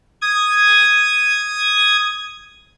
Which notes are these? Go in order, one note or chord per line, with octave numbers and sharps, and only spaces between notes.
D#6 G#6